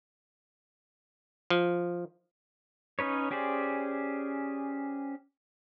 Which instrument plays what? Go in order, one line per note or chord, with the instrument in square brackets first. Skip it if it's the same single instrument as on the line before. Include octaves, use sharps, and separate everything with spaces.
[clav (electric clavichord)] F3
[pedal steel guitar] C#4 D#4 B4 C#5
C#4 G4 G#4 C5 D5